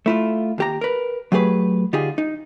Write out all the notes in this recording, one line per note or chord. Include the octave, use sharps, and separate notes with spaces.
A3 E4 F4
D#2 G4 A#5
A#4 B4
F#3 A3 G4 G#4 B4
D3 D#4 F4 G4 G#4
D#4